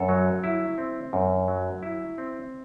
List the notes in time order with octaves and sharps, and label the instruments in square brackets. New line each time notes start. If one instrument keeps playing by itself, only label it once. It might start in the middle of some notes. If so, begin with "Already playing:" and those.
Already playing: [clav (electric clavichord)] F#2 A4
F#3
E4
C4
F#2
F#3
E4
C4